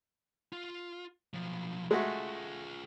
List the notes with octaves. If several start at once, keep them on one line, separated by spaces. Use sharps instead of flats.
F4
B1 F3
G#3 A3 F4 F#4 G#4